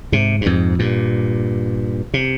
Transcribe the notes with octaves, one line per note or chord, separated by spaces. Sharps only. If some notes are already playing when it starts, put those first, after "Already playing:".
G#2 C3
G2
F2 G#2
G2 A#2
C3